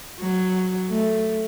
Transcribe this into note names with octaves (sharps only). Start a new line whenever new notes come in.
F#3
A3